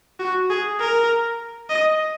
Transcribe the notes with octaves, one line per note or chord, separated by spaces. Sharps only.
F#4
G#4
A#4
D#5